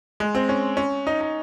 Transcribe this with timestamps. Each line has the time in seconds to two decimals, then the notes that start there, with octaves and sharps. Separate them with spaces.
0.20 G#3
0.35 C4
0.49 C#4
0.77 C#4
1.07 D#4
1.21 D#4